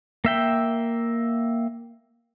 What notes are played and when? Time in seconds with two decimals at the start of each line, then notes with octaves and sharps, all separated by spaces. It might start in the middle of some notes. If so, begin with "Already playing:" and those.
0.25 A#3 E5 G5